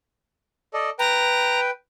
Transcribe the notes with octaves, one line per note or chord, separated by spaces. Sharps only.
A4 D5 D#5
B4 G5 A#5